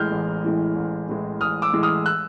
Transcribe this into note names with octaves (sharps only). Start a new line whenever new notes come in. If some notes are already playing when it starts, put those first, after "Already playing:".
Already playing: A1 A2 E3 G#3 F6 G6
A1
A2 E3 G#3
A1
A2 E3 G#3
A1 D#6 F6
D6 E6
A2 E3 G#3
D#6 F6
E6 F#6